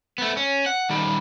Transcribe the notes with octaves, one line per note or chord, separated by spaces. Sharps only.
A3 B3
C#4
F#5
D#3 G3